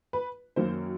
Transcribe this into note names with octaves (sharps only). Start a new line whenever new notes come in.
B4
F#2 D#3 F#3 A#3 C5